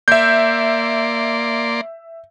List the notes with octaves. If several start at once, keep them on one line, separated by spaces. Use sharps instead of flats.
A#3 D5 E5 C6 G6